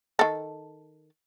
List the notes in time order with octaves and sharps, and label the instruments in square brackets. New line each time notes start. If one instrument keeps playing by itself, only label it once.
[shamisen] D#3 A4